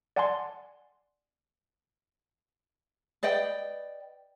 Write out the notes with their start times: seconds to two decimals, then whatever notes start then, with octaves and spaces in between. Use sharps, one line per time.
0.16 D5 F#5 G#5 A5 C6
3.23 B4 D5 D#5 G5